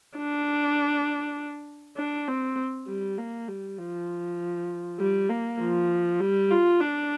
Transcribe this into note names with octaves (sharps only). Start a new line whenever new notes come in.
D4
D4
C4
G3
A#3
G3
F3
G3
A#3
F3
G3
F4
D4